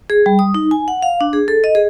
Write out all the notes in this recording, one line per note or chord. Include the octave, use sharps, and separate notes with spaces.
G#4
G3
D#6
D#4
G#5
F#5
F5
D4
G#4
A4
D#5
G#4